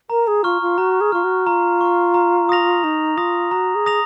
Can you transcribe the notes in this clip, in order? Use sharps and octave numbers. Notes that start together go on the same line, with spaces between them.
A#4 A#5
G#4
F4 C#6 F6
F4
F#4 A#5
G#4
F4 C#6 F6
F#4
F4 A#5
C#6 F6
A#5
D#6 A#6 F7
D#4 A#5
F4 D#6 A#6 F7
F#4 A#5
G#4
D#6 A#6 F7